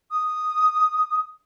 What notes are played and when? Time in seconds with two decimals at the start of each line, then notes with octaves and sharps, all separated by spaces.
0.11 D#6